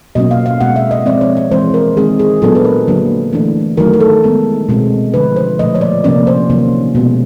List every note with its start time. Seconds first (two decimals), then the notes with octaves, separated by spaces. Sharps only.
0.15 B2 F#3 A#3 C#4 D#5
0.31 F5
0.46 F5
0.61 B2 G#3 C4 F#5
0.76 E5
0.91 D#5
1.06 F3 G#3 C4 D5
1.21 C#5
1.37 C#5
1.51 E3 G#3 C4 C5
1.74 A#4
1.97 D#3 G#3 C4 G#4
2.19 G#4
2.42 A#2 F#3 B3 D4 A4
2.55 B4
2.65 A#4
2.87 D3 F#3 A#3 D4
3.33 E3 A3 D4
3.77 D#3 F#3 A3 A#4
3.93 A#4
4.00 A4
4.24 D#3 G#3 B3
4.69 B2 G#3 C4
5.14 D3 F3 G#3 B4
5.36 C5
5.59 A#2 F3 A3 D#5
5.75 C#5
5.81 D5
6.04 C3 F3 A#3 C#4 D5
6.27 C5
6.50 C3 D#3 F#3 A#3 C#4
6.95 B2 G#3 B3